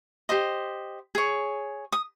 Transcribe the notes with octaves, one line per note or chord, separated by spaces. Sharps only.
G4 C5 D#5
G#4 C#5
D#6